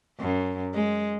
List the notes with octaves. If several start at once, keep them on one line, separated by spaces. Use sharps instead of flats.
F#2
G#3